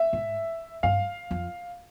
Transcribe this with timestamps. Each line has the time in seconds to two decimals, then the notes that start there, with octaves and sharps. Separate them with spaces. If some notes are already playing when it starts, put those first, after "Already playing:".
Already playing: E5
0.13 G#2
0.83 G2 F5
1.31 F2